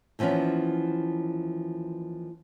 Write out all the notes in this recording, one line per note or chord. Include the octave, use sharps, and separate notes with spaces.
D#2 E3 F3 B3 C#4